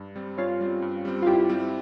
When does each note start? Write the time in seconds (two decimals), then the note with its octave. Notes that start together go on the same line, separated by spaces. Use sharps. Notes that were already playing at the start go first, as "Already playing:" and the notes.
Already playing: G2
0.16 G3 C4
0.38 G2 C#4 F4
0.61 G3 C4
0.82 G2
1.05 G3 C4
1.22 F4
1.26 G2 E4 G4
1.49 G3 C4